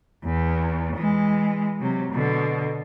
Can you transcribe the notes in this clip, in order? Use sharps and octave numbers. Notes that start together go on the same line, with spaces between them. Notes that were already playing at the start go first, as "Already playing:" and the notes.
E2
E3 G#3
C3 F#3
B2 D3